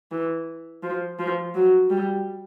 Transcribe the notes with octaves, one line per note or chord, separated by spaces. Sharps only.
E3
F3
F3
F#3
G3